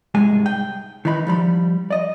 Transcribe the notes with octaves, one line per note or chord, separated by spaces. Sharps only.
C2 G#2 G#3 G#5
G5
D#3 E3 D#4 B5
F3 G3 B5
D5 D#5